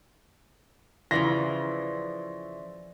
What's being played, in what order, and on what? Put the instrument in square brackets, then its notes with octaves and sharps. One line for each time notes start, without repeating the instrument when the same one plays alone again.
[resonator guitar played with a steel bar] C#3 E3 F3 [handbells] D5 E5 C6 [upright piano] A#6